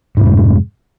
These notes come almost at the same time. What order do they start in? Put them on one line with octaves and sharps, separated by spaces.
G#2 C3 F2 G#3